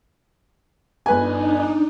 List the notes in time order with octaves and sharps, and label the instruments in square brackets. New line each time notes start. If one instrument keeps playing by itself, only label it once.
[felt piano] G1 B4 G#5 [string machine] D4 D#4